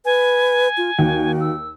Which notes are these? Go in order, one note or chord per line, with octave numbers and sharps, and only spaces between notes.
B4 G#5
F4
D#2 F#4
E6